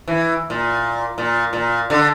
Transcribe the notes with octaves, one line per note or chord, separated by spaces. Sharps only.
E3
A#2
A#2
A#2
D3